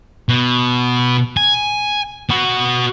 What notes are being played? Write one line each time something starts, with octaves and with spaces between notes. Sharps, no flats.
B2
G#5
B3 F#4